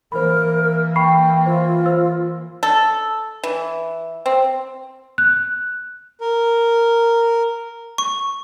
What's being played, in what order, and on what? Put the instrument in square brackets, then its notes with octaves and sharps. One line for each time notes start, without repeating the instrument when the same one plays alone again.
[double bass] E3 A#3 [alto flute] A#4 [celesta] C5 B5
[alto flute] G5 [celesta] B5 C#6 C7
[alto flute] F4 [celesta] C5
[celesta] C5 E6
[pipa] A4
E3
C4
[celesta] F#6
[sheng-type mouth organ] A#4
[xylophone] C#6